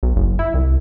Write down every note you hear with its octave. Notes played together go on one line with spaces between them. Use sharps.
B1
F#1
E4
C2